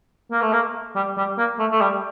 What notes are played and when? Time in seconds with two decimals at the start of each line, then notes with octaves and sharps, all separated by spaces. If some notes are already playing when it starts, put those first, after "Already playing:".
0.31 A#3
0.42 A3
0.53 A#3
0.95 G3
1.17 G3
1.38 A#3
1.59 A3
1.72 A3
1.81 G3